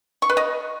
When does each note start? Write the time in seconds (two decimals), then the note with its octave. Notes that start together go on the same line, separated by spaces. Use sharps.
0.22 C#6
0.29 B4
0.37 D#5